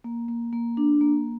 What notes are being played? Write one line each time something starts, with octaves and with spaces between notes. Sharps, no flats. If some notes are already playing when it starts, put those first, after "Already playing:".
A#3
A#3
A#3
D4
A#3